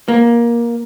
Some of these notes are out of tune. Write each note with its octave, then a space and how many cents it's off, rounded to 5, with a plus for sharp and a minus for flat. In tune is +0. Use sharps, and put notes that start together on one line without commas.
A#3 +15